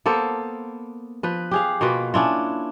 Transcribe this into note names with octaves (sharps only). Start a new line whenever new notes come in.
A#3 B3 A4 C5
F3 B4
G4 G#4 F5
B2 A#3 F4 B4
C#4 D4 E4 F4